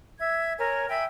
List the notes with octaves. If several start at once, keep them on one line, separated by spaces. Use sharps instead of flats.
E5 G#6
A#4 C#5 G#5
E5 G5 G#5 B5